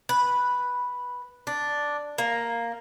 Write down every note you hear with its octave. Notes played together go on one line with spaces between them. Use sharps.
B4
D4
A#3